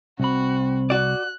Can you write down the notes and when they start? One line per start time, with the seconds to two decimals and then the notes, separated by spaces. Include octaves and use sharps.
0.20 C2 C4 F#4 B5
0.90 F#4 D5 F#6